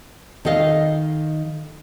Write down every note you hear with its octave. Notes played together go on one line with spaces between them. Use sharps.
D#3 A4 D#5 F5